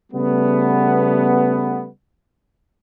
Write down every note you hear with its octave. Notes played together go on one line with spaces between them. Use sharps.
C#3 G3 A3 B3